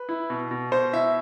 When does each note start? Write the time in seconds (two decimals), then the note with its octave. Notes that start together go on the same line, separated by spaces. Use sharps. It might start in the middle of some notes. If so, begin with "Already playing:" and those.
Already playing: B4
0.09 E4
0.30 B2
0.51 B2
0.72 B2 C5
0.93 E4 E5